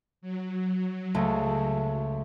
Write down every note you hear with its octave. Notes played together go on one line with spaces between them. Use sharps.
F#3
C#2 G#3 A3